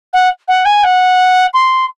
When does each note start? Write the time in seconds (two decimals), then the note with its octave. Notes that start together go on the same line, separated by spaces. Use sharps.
0.13 F#5
0.48 F#5
0.65 G#5
0.83 F#5
1.53 C6